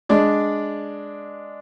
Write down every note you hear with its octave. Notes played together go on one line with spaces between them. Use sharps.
G#3 D4 D5